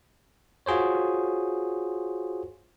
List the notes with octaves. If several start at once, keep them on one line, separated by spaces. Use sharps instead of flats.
F4 F#4 G#4 C5 C#5